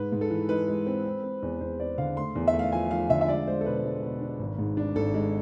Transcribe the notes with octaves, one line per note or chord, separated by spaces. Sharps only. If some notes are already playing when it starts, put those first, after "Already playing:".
Already playing: G#2 B4
G#2
A4
E3
G#3 B4
G#3
C4
C4
C4
E2
E2 C5
C4 D5
D3 F5
A3 C6
E2
E5
A3
F5
F3 G#5
F3 F5
D3 E5
E5
G#3 D5
G#3 C5
A4
B2 B4
G#3
B2
D4
G#1
G#2
D4
G#1 A4
G#3